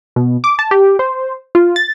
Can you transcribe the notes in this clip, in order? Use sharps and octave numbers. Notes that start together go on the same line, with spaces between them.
B2
D6
A5
G4
C5
F4
A6